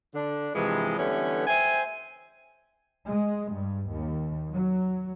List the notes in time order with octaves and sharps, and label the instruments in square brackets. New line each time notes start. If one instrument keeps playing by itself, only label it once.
[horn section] D3 D4
G2 C3 E3 F3 G#3
D3 E3 G3 A3 B3 C#4
C5 E5 G5 G#5
[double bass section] G#3
G2
D#2
F#3